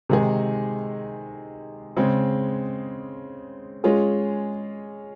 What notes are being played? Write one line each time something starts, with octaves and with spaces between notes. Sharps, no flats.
C3 D#3 G#3 D#4 G#4
C#3 G#3 C4
G#3 C#4 F4 G#4